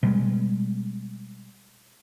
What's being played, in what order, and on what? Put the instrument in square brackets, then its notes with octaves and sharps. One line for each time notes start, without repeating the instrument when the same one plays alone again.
[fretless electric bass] B2 G3 G#3